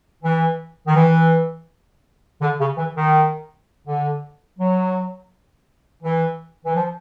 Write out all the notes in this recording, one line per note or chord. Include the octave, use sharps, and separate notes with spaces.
E3
D#3
E3
D3
C#3
E3
D#3
D3
F#3
E3
E3
F3